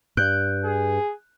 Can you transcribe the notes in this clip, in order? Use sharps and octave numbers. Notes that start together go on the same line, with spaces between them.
G2 F#6 G6 D7
G#4